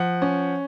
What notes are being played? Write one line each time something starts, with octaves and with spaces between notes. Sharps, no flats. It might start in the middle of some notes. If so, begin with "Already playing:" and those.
Already playing: F3 F#5
C#4